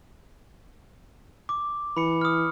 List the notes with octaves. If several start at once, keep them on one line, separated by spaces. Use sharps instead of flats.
D6
E3 B5 C#7
D#6 F6